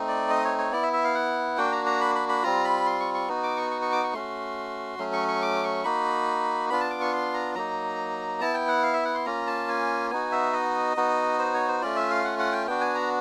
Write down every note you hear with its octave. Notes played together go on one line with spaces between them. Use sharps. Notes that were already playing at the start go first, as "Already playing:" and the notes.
Already playing: A3 C4 D#4
D5
D#5
C#5
C#5
B3 E4 D5
E5
E5
F5
F#5
A#3 D4 F#4 G5
A#5
A#5
B5
B5
B5
G3 C4 F4 A#5
B5
C6
C#6
C#6
B3 D#4 F#4
D6
C#6
C#6
C#6
D6
C#6
A3 C#4 F#4 C6
F#3 A3 C#4
C#6
C#6
D6
C#6
A#3 D#4 F#4 B5
B3 D4 F4 B5
A5
D6
C#6
C6
A#5
F#3 A#3 D#4 A#5
B3 E4 A5
G5
F#5
F5
E5
F#5
C6
A#3 C#4 F4 A#5
A5
G#5
B3 D#4 F#4 G#5
E5
D#5
B3 D#4 F#4
C5
C#5
C5
A3 C#4 F4 D5
E5
F5
F#5
F#5
G5
B3 D4 F#4 G5
G#5
A#5